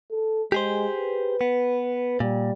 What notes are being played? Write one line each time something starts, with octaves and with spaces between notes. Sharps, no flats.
A4
G#3 G4 G#4 C5
B4
B3
A#2 G3